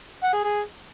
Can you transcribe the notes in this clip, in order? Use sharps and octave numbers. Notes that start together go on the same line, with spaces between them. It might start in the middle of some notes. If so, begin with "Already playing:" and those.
F#5
G#4
G#4